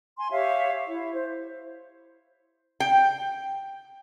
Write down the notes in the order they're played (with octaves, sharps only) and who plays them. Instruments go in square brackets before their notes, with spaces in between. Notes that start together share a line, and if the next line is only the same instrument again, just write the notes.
[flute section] G#5 C6
G4 C#5 E5 F5
E4
C5
[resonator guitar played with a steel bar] G5